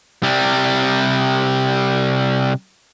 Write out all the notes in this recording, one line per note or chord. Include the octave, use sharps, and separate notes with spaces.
C3 G3